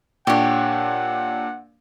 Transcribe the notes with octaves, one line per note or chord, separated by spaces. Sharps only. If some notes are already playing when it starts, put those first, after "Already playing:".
A#2 D4 G4 C#5 F#5